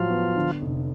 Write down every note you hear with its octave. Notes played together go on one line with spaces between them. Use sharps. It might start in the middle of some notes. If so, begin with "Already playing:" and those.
Already playing: A2 F3 F#3 F4
B3
D3
F1